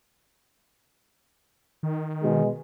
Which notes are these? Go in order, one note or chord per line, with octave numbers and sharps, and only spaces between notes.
D#3
B2 G#3